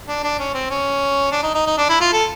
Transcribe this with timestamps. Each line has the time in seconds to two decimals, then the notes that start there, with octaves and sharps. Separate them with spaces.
0.08 D4
0.24 D4
0.40 C#4
0.54 C4
0.71 C#4
1.32 D4
1.43 D#4
1.55 D#4
1.67 D#4
1.78 D4
1.90 E4
2.01 F4
2.13 A4